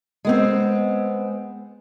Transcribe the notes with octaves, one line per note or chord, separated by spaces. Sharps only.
G#3 B3 C4